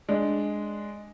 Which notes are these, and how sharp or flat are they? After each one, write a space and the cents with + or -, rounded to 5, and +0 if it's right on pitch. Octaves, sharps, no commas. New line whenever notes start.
G#3 +0 D4 +0